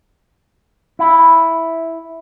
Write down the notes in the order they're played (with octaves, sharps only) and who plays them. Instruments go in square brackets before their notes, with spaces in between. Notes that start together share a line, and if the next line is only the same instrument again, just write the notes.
[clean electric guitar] E4